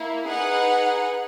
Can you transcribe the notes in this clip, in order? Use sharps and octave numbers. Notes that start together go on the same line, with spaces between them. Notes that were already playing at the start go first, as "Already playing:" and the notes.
Already playing: A#3 E4
D#4 G#4 B4 F#5